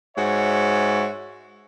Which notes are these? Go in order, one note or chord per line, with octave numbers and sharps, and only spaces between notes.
G#2 F#4 C#5 E5